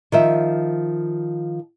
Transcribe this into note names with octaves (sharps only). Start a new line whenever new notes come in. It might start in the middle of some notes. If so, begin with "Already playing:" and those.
D#3 F3 E5